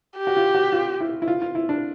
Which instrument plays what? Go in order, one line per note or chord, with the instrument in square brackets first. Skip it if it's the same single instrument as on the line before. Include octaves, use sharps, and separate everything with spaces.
[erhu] G4
[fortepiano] F#4
F4
F#4
F4
E4
E4
F4
F4
E4
D4